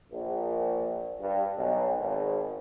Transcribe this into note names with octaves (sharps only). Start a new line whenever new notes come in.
A#1
G2
B1
G#1